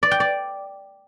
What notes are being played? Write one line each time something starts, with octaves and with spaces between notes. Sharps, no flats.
D5
G5
D5